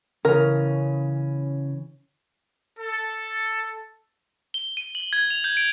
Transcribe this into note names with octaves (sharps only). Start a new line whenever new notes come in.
C#3 E3 C#4 A#4
A4
G7
D#7
F#7
G#6
F7
G6
D7